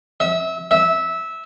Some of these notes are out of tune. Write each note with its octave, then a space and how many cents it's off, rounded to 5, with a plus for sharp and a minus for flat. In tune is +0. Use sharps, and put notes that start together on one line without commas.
E5 -25
E5 -15